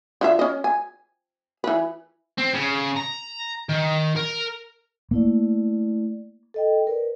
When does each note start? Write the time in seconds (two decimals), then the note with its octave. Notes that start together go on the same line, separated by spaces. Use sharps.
0.21 D3 F4 E5
0.39 C#4 D#5
0.64 G#5
1.64 E3 B4
2.38 C4
2.54 C#3
2.97 A#5
3.69 D#3
4.16 A#4
5.11 A3 A#3 E4 D5
6.54 A4 D#5 G5
6.87 A#4 B4 D5